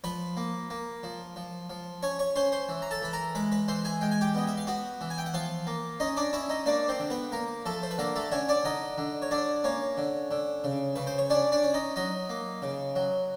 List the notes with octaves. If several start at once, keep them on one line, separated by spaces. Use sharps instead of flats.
F3 B4 B5
A#3
A#3
F3
F3
F3
C#4 C#5 C#6
C#5 C#6
C#4 C5 C6
C5 C6
E3
A#5
A4 A5
E3 B5
A#4 A#5
G#3 B4 B5
B4 B5
E3 C5 C6
G#4 G#5
G#3 G5
G#5
G4 G5
B3 D#5
E5
F5
B3 F#4 F#5
E3
G#5
G5
F#5
F3 F4 F5
A#3
C#4 D#4 D#5
D4 D5
C#4 E4 E5
D#4 D#5
A#3 D4 D5
C4 C5
D3
B3 B4
A#3 A#4
F3 A3 A4
C5
B4
D3 A#3 A#4
A3 A4
D3 C#4 C#5
D4 D5
D3 D#4 D#5
D3
C#5
D3 D4 D5
A#3 C#4 C#5
D3
D3
C#3
C#3 B4
C5
C#5
C#4 D4 D5
D4 D5
C#4
D#4 D#5
F#3 D#4 D#5
A#3
C#3
F#3